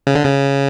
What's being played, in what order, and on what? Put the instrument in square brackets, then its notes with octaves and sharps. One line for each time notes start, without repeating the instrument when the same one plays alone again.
[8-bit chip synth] C#3
D3
C#3